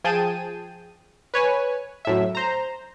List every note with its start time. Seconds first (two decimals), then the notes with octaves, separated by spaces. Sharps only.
0.04 F3 G#4 G5 A5 D#7
1.34 B4 C#5 G#5
2.05 F#2 A2 E5
2.35 C5 A#5